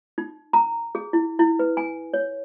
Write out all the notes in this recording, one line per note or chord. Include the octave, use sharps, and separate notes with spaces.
D#4
A#5
G#4
E4
E4
B4
G#5
C#5